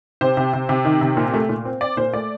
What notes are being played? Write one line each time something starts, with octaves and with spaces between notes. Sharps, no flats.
C3 C5
C3
C3
C3
D#3
C3
A#2
A3
A#2
C4
C4 D5
A#2 C5
A3 D5